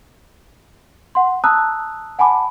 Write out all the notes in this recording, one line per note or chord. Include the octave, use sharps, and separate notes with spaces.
F#5 C6
A5 A#5 D#6 E6 F#6
F#5 G#5 A5 B5 D6